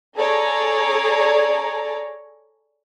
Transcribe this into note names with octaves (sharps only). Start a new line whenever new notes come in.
G#4 A4 C#5 D5 A#5